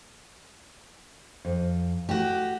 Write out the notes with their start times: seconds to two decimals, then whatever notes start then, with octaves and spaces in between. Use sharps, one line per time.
1.45 F2
2.09 A3 F#4 G4